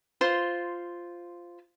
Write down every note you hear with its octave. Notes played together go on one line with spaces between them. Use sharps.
F4 C5 C6